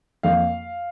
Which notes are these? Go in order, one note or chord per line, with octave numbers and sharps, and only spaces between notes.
F2 F3 A#3 F5